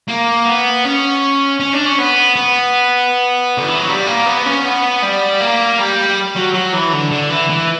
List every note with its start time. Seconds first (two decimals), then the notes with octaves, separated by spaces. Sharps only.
0.08 A#3
0.46 B3
0.85 C#4
1.60 C#4
1.73 D4
1.86 C#4
1.98 B3
2.36 B3
3.58 D3
3.68 E3
3.78 F#3
3.88 G3
4.07 A#3
4.26 B3
4.46 C#4
4.64 B3
5.03 G3
5.40 A#3
5.79 G3
6.36 F#3
6.54 F#3
6.73 E3
6.93 D3
7.11 D3
7.30 E3
7.50 E3